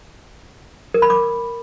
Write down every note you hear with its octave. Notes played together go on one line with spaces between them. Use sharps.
A#4
B5
D6